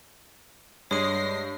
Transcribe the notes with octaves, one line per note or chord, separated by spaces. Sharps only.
G2 G#3 C#5 D#6 A#6 C7